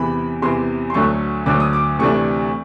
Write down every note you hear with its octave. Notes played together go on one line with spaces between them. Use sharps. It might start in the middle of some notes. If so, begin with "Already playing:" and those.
Already playing: E2 C3 E3 B5
E2 C3 E3 C6
C6
D2 D3 F#3 A3 C#6
D2 D3 F#3 A3 D6
D#6
D6
D2 C3 E3 A3 D4 C#6